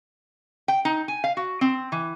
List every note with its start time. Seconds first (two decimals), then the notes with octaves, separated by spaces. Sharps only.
0.68 G5
0.85 D#4
1.08 G#5
1.24 F5
1.37 F#4
1.61 C4
1.92 E3